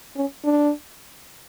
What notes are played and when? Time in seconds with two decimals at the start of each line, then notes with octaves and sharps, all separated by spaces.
0.16 C#4
0.45 D4